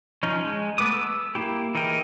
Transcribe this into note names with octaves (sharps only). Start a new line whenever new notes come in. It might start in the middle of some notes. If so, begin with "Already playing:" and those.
F3 C#4 D#4
G#3
A3 B3 B4 D6 D#6
E6
A#3 E4 G4
E3 D#4 G#4 A#4 G5